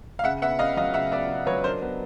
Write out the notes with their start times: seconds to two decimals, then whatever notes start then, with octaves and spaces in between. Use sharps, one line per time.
0.19 F5
0.24 C#3 E5 F#5
0.42 B3 E5 F#5
0.59 C#3 D#5 F5
0.77 F#3 D#5 F5
0.94 C#3 E5 F#5
1.11 B3 D5 E5
1.29 C#3
1.47 F#3 B4 C#5
1.64 D4 A#4 C5
1.82 B3